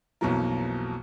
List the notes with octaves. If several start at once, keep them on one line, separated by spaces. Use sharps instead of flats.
B1 F2 B2 E3 F#3 A#3